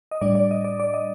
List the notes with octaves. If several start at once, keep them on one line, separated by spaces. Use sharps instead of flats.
D#5
A2 G3 D4 D5
D5
D#5
D5
D5
D#5